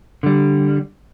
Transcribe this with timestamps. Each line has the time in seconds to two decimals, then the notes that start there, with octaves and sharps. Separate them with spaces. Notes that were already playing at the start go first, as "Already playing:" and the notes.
0.23 D3 G3